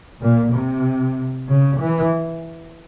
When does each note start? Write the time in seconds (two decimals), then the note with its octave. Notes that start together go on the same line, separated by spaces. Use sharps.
0.21 A#2
0.54 C3
1.49 C#3
1.79 E3